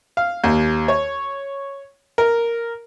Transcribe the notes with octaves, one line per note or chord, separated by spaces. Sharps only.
F5
D#2
C#5
A#4